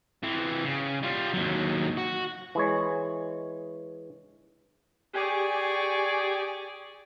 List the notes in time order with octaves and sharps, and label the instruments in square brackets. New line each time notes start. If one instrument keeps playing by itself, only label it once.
[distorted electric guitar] E3 C4
C#3
G3 F4
D#2 F#3
F#4
[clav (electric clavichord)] E3 G#3 C#5
[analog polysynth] G4 G#5 [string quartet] G#4 D5 C#6